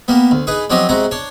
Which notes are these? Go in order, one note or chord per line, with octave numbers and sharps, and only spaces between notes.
G3 A#3 B3
D2
D#4 G#4 B4
F3 F#3 C4 D4 G4 D#5
C3 G#3 F#4 A#5
D4 C#5